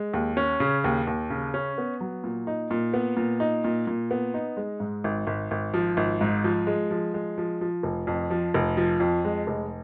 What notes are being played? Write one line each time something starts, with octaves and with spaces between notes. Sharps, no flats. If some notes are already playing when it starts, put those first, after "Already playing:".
Already playing: G#3
D#2
C#4
C#3
D#2
D#2
C#3
C#4
B3
F#3
A#2
D#4
A#2
B3
A#2
D#4
A#2
A#2
B3
D#4
G#3
G#2
G#1
G#1
G#1
F3
G#1
G#2
F3
G#3
F3
G#3
F3
F3
F1
F2
F3
F1
F3
F2
G#3
F1